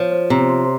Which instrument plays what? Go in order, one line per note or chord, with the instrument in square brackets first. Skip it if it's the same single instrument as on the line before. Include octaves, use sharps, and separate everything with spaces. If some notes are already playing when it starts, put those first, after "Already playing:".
Already playing: [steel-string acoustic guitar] F3 [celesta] C#5
[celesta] C5
[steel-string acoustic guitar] C3 [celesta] A#5
[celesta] C6